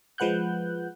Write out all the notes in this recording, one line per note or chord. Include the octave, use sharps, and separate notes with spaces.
F3 G#3 B4 F#5 F#6 G6